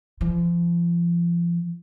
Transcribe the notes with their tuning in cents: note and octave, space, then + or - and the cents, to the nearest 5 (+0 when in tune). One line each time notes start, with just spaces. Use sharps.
F3 -30